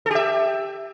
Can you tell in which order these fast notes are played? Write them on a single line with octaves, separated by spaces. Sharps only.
A4 G4 E5